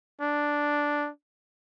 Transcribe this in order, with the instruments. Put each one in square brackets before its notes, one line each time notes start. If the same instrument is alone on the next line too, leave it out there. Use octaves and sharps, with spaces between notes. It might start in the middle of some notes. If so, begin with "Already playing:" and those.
[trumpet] D4